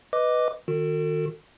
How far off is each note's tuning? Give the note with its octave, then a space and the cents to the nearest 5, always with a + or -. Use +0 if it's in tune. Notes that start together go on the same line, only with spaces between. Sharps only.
B4 +5 D#5 +0 D6 +0
D#3 +0 F#4 -40 A4 +40